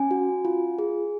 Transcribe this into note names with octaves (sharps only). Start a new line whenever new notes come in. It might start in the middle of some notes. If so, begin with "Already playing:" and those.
Already playing: C#4 G#5
F#4
F4
G#4